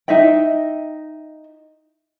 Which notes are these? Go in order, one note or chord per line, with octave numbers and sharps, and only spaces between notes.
D#4 D#5 E5 G5